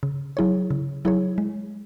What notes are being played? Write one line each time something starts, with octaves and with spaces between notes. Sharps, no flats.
C#3
F#3 E4 G#4 C#5
C#3
F#3 E4 G#4 C#5
G#3